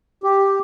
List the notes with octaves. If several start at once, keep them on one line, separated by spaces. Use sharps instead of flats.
G4